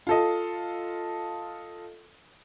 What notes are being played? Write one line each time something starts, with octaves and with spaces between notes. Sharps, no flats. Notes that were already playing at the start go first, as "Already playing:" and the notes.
F4 A4 D#5